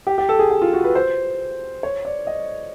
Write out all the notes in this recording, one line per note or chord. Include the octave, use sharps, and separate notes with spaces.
G4
G4
A4
G#4
G4
F4
F#4
B4
C5
C#5
D5
D#5